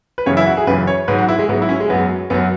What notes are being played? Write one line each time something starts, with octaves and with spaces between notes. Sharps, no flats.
B4
F#2 C#3 E3 C#5
E4
F#4
G#4
F#2 C#3 E3 B4
C#5
G#2 F#3 B4
F#4
E4
G#3
G#2 F#3 B3
E4
C#4
G#3
F#2 F#3 B3
F#2 F#3 B3